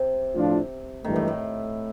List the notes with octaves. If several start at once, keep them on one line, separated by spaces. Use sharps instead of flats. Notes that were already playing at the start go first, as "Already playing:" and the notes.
Already playing: C3
A2 F3 A3 D4 F4
G#1 G2 D#3 E3 A3
A2
A2